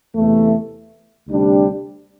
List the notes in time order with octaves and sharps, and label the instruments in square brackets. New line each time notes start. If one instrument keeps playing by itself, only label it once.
[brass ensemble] E2 C3 E3 A3
D2 C3 G3 D4 G4